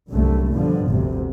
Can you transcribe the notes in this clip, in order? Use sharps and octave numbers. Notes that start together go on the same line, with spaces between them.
C2 F#2 D3 A3
G2 B2 D3 F3
G1 D2 C3